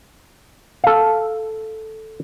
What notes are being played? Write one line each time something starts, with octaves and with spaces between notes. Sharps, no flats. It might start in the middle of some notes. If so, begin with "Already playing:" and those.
A4 F5